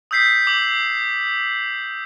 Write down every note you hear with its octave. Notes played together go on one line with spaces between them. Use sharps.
D#6 E6 G6 B6 C7
D6 F#7